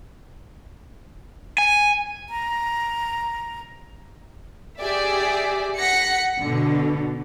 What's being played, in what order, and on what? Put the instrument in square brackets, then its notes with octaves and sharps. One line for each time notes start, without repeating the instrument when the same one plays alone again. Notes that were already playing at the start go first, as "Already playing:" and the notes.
[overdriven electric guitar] G#5
[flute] A#5
[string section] G4 G#4 D5 E5
F#5 A#6 B6 C#7
B2 D3